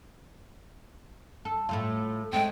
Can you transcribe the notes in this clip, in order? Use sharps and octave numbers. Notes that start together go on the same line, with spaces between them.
A4
A2 A3 F4
G#3 A3 C4 G5